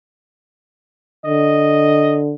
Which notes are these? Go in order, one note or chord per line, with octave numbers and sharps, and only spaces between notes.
D3 D#5